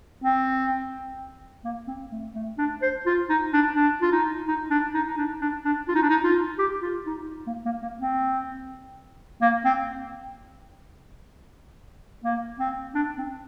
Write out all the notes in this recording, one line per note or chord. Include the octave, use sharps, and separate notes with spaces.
C4
A#3
C4
A3
A3
D4
C5
F4
D#4
D4
D4
F4
D#4
D#4
D4
D#4
D#4
D4
D4
D4
F4
D#4
D4
D#4
F4
G4
F4
D#4
A#3
A#3
A#3
C4
A#3
C4
A#3
C4
D4
C4